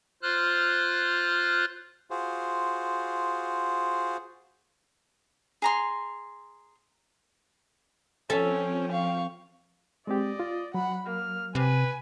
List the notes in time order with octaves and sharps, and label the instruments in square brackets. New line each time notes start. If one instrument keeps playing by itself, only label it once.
[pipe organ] F4 C5 F6 F#6
[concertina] F4 F#4 G#4 C5
[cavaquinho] G#4 A#5 C6
[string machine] F3 C4 G5 [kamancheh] C#4 [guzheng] A4 E5
[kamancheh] F5 C#6
[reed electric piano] G#3 C4 G4 [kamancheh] D5 [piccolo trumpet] D#5
[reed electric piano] F4
[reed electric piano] F#3 [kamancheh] F#5 B5
[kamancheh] A#3 [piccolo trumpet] F6
[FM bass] C3 [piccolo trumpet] B4 [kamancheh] G#5